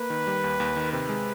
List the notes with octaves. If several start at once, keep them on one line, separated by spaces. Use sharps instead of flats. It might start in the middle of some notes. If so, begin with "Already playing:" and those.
Already playing: A#3 B4
D#3
G3
D#2
D#2
D#3
C3 B4
G#3